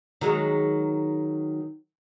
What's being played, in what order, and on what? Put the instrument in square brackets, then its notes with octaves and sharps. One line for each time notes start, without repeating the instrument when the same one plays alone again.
[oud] D#3 F#3 G#3